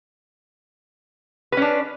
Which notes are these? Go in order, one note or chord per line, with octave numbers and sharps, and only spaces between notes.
C#4 D4 B4